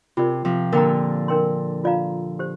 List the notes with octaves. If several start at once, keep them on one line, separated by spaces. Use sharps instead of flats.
C3 F4 A#4 D5
C3 F3
A#2 D3 A#4 G5 A#5
D4 A#4 G5 C6
F4 D5 F5 A#5
G4 C5